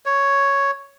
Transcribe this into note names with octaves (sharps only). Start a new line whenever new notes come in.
C#5